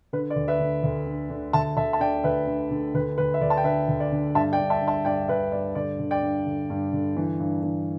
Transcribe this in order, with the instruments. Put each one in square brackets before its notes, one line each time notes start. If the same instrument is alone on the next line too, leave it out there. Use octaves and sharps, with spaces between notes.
[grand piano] D3 B4
D5
D2
B4 E5
D3
D2
D3
D3
D2 E5 A5
D2 E5 A5
A5
D3 D5 G5
D2 B4 E5
D3
D3
D2 B4
D2 B4
E5
D2 D5
A5
G5
D3 B4 E5
D2
D5
D3
G2 E5 A5
D5 G5
G2
E5 A5
D3
E5 A5
G2 D5 G5
D3 B4 E5
G2 D5
D3 D5
D3
D5 G5
G2
D3
G2
D3
E3
G2
E3